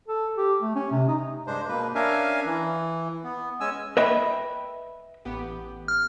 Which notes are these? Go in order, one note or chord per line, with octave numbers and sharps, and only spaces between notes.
A4
G4
A3
C#4
C3
D#4
G2 G#3 D4 C5
B2 A#3 B4
C#4 D4 A#4 E5 F5 G#5
E3
B3
G#3 C#4 G#5 E6
B4 D#5 E5 G5 B5
A1 B3 G4
F6